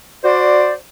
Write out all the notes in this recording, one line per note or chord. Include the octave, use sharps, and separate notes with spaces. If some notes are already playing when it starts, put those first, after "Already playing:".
F#4 C5 D5